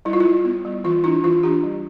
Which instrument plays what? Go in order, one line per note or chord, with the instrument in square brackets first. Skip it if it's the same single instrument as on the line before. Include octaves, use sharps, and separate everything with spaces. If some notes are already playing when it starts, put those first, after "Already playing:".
[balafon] G3 E4
F4
E4
G3
B3
G3
E3 F4
D4 E4
E3 F4
D4 G4
G3